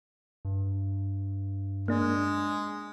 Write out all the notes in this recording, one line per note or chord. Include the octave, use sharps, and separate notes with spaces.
G2
G#3 A#3 D4